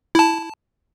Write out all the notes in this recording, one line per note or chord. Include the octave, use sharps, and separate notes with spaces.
E4 A5